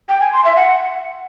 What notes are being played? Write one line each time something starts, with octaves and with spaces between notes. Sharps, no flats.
G5
G#5
C6
E5
F#5